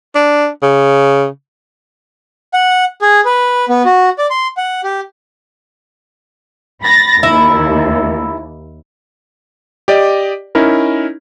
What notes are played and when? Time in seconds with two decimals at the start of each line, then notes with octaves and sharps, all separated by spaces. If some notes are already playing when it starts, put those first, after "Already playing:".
0.15 D4
0.63 C#3
2.54 F#5
3.02 G#4
3.25 B4
3.69 B3
3.85 F#4
4.19 D5
4.30 C6
4.57 F#5
4.84 G4
6.84 B5 A6 A#6
7.23 D#2 E4
9.88 G4 D5 D#5
10.55 C#4 D#4 E4 A#4